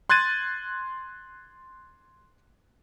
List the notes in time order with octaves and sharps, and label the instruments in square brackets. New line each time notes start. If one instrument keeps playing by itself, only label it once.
[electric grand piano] C6 F#6 G#6 A6 D#7